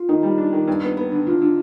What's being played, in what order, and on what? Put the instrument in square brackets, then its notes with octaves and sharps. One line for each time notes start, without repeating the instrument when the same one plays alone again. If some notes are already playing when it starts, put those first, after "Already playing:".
Already playing: [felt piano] F4
[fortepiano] D#3 [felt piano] D#4
[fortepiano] G3
D4
D#3
G2
B3
B3
D3
[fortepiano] D3 [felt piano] F4
[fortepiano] D3